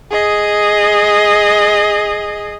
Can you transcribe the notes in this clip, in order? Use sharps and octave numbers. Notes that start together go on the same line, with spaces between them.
G#4 D#5